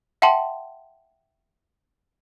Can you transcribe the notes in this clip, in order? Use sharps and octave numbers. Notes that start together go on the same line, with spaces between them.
E5 F#5 G5 A5 C6